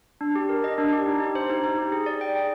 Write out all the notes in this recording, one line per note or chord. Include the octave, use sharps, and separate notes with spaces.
D4
G4
A#4
D#5
D4
G4
D#4
G4
C5
D#4
D#4
G4
G#4
D5
G5
G#4